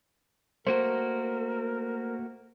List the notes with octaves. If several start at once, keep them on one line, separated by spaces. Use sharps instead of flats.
A3 A#3 F#4 A#4 C5